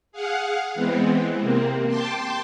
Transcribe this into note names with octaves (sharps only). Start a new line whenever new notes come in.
G#4 F5 F#5
E3 G#3 B3 C4
C3 A#3 C4
G5 A5 C6 D6